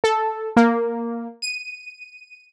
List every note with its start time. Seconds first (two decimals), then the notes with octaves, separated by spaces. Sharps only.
0.04 A4
0.57 A#3
1.42 D#7